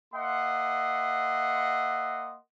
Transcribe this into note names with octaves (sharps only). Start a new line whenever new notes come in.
A#3 D#5 E5 F#5 C6